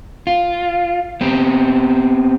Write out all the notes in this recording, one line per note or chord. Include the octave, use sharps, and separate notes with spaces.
F4
B3 C4 G4